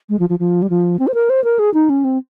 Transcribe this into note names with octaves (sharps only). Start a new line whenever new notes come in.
G#3
F3
F3
F3
G3
F3
C4
C5
A#4
C5
A#4
G#4
D#4
C#4
C4